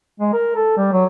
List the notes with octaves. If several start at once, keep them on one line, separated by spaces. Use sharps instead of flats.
G#3
A#4
A4
G3
F#3